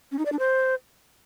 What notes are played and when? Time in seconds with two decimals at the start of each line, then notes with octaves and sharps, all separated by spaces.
0.12 C#4
0.19 D#4
0.26 D5
0.32 D4
0.39 C5